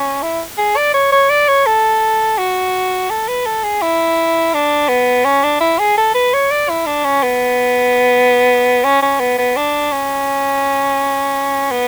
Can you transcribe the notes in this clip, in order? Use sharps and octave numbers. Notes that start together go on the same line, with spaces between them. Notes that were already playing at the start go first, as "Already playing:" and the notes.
Already playing: C#4
E4
G#4
D5
C#5
C#5
D5
C#5
A4
F#4
A4
B4
A4
G#4
E4
D4
B3
C#4
D4
E4
G#4
A4
B4
C#5
D5
E4
D4
C#4
B3
C#4
C#4
B3
B3
D4
C#4
B3